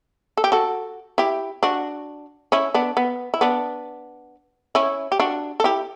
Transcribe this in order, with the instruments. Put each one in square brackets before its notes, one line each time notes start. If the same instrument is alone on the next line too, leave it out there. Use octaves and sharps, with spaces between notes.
[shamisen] A4
G4
F#4 A4
E4 G4
D4 F#4
C#4 E4
B3 D4
B3
E4
B3 D4
C#4 E4
G4
D4 F#4
A4
E4 G4